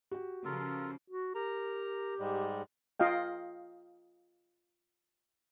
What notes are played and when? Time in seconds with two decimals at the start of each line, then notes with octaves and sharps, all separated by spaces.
0.11 F#4 G4
0.45 C#3 F3 F4 A4 A#4
1.10 F#4
1.35 G4 A#4 A#5
2.19 G#2 G3 G#3
3.00 F4 D#5 F5 G5